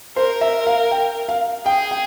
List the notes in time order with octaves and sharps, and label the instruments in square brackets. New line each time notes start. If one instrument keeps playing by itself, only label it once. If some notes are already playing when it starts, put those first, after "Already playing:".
[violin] A#4 [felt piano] C5
[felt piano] E5
F5
G5
F5
[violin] G#4 [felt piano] G5
[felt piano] G5